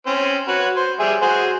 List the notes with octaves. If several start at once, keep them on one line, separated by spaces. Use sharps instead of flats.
C4 C#4 C5
F#4 B4 C#5
C5
G3 G#4 E5
F#4 G#4 C5